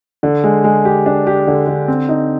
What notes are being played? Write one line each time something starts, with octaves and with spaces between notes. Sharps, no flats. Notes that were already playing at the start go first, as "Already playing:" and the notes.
D3
G#3
G#3
G4
D4
G4
D3
D3
C4
D#4